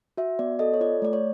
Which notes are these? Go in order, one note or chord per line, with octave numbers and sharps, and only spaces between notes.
F#4 E5
B3 D5
A4 D#5
C#5
F4 D5
A3 D5
C#5